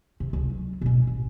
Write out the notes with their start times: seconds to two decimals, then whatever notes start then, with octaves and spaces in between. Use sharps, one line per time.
0.20 C3
0.33 C#2
0.50 F#3
0.81 B2 C#4
1.07 A1